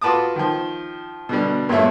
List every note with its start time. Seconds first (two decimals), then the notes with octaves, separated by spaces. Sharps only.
0.01 F4 F#4 B4 A5 D6 D#6
0.36 D#3 F3
1.29 B2 D3 G3
1.69 G2 A#2 G#3 A3 C#5 E5